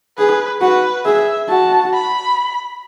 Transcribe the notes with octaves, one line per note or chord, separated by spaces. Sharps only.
G#4 B4
F#4 B4
G#4 E5
F#4 A5
B5